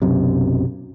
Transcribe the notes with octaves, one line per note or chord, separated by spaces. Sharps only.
B1 F#2 C3